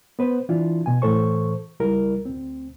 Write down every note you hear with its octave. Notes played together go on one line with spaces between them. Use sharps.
B3 B4 C5
E3 D4 E4 F4
B2 G#5
A2 E3 A4 C5 C#6
C#2 G3 E4 A#4
D2 C4